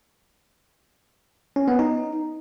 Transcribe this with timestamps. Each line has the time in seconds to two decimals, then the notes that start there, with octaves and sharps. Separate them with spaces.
1.56 C#4
1.68 B3
1.79 D#4